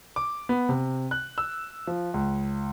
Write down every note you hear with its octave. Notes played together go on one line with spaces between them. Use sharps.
D6
B3
C3
F#6
E6
F3
C#2